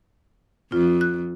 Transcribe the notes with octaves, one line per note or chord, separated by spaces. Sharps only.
F2 F4
F#6